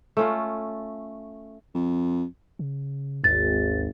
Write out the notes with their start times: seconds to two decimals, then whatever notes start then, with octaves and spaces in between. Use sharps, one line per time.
0.17 A3 C#4 F4
1.75 F2
2.59 C#3
3.24 G#1 D#2 A6